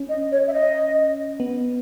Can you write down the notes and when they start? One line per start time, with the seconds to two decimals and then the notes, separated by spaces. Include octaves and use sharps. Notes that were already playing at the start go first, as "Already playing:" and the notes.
Already playing: C#4
0.09 D#5
0.32 C#5
0.47 E5
0.53 D#5
1.40 B3